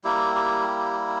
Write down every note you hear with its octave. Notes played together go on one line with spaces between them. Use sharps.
G3 A#3 E4 G4
G4
G4